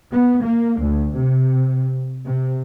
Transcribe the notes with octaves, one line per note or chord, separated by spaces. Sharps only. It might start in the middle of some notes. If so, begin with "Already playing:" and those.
B3
A#3
D2
C3
C3